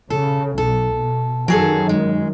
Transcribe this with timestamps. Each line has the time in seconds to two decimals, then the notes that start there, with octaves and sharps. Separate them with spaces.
0.10 C#3 A4
0.58 B1 A4
0.95 B2
1.48 F#2 D#3 F#3 G#4 A4
1.89 G#3